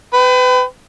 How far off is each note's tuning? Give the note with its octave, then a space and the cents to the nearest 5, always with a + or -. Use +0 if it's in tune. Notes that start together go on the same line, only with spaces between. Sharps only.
B4 +35 G5 -5